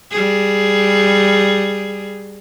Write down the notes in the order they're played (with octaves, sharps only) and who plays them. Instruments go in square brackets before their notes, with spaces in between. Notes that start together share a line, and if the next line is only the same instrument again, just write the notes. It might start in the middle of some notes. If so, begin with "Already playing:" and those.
[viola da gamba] G3 G#4